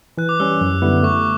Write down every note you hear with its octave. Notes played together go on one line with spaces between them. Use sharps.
E3 F#6
D6
G3 C#4 E6
F#2
D3 G3 B3 E4
A3 C#6